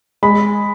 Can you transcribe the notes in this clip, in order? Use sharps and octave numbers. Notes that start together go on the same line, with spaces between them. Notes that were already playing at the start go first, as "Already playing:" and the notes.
G#3 B5